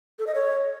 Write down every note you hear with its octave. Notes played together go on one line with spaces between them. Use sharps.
A4
D#5
C#5